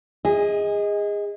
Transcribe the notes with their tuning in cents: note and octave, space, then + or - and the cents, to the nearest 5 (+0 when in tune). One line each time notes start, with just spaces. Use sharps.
G#4 -25 D#5 +15